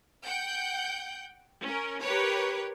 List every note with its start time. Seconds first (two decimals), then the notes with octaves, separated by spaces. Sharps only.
0.25 F#5 G5 G6
1.63 C#4 A#4
2.02 G4 A#4 B4 C#5